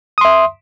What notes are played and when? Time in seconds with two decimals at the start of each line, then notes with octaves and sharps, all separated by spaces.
0.18 D#6
0.21 C6
0.25 E5